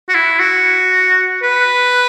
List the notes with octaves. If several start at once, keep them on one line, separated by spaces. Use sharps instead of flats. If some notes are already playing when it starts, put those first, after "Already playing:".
F#4
E4
F#4
B4